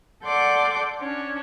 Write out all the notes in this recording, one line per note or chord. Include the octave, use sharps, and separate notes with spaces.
A4 D5 F#5 C6 D6 G6
C#4 D4